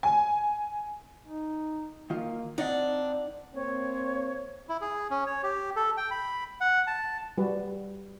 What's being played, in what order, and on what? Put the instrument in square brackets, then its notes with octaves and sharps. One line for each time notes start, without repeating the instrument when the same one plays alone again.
[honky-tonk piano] G#5
[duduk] D#4
[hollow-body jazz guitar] D#3 F4 [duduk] A#3
[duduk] C4 [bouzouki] D4 [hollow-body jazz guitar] D#4 D#5 F#5
[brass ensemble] A#3 C4 [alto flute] C#5
[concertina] E4
G#4
C#4
C#5
G4
A4
G5
B5
F#5
A5
[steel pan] G3 F#4 B4